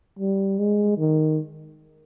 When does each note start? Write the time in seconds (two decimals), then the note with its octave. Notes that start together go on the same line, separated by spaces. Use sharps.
0.19 G3
0.59 G#3
0.98 D#3